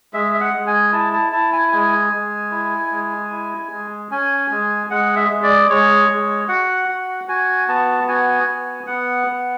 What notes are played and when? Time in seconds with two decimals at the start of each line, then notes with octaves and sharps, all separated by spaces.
0.14 G#3 E5
0.34 E5
0.41 F#5
0.53 G#3
0.67 G#5
0.93 E4 A5
1.13 A5
1.32 E4 A5
1.53 G#5
1.72 G#3 G#5
2.13 G#3
2.52 E4
2.92 G#3
3.32 E4
3.72 G#3
4.11 C#4 G#5
4.51 G#3
4.90 G#3 F#5
5.16 E5
5.29 G#3
5.43 D5
5.69 G#3 C#5
6.09 G#3
6.48 F#4 F#5
6.89 F#4
7.28 F#4 G#5
7.68 B3 A5
8.08 F#4 G#5
8.47 B3
8.87 B3 F#5
9.27 B3